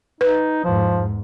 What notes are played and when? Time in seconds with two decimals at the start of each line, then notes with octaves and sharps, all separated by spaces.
0.21 D#4 B4
0.64 E2 G#2 F3